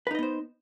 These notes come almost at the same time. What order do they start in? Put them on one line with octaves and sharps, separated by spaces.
B4 D#4 D#5 B3 C5